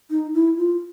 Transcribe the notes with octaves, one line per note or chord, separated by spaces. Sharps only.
D#4
E4
F4